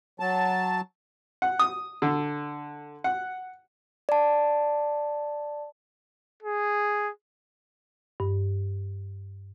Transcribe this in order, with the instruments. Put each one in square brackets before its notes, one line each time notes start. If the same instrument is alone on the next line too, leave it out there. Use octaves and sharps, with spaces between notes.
[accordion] F#3 A5
[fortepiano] F#5
D#6
D3
F#5
[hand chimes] D5 A5
[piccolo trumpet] G#4
[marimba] G2